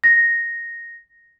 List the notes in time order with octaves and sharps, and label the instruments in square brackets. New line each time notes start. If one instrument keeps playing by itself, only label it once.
[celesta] A#6